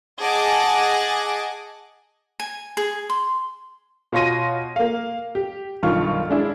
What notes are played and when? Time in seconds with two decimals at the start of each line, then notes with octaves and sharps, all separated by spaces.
0.21 G#4 D#5 F#5 G#5 A5 D6
2.40 G#5
2.77 G#4
3.10 C6
4.12 B2 F4 C#5 C6 A#6 D#7
4.76 A#3 F5
5.35 G4
5.83 B1 G2 D#3 F4 C#6 F6
6.30 G#3 D4 E4